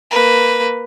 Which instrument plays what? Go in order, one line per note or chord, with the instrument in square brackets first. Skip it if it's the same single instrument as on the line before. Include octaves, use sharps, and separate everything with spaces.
[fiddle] A#3 B4